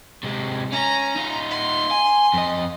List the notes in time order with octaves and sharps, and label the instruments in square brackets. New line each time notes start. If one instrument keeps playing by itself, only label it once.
[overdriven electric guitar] C3 G#3
[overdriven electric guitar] C#4 [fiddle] A#5
[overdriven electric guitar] D#4 F4
[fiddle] C6
[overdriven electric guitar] G#5
F2 D#5